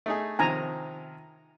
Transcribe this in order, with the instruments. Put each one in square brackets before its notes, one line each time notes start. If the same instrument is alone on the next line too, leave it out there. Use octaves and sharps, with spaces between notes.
[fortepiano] A3 D#4 G#4
[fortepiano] C3 D#3 F3 [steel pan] G#5 A#5